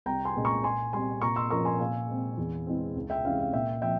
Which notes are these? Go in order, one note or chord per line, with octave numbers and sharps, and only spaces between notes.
C2 G5 A#5
G#5 C6
A#2 G#3 C#4
A#5 C#6
A#2 G#5 C6
G3 C4 G#5 C6
A#2 A#5 C#6
C6 E6
F3 A#3 C#4 A#5 C#6
G#5 C6
A#2 F5 G#5
G#3 C4
E2
E3 G#3 C4
C#2
E5 G5
C3 E3 G#3 C#4 F5
F5
A#2 E5 G5
F3 E5 G5